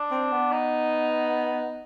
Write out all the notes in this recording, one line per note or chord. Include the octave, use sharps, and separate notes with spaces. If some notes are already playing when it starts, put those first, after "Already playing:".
Already playing: D4
C4
B3
D#4